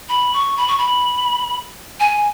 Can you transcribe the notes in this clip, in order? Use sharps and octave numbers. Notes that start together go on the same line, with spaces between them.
B5
C#6
B5
C#6
B5
G#5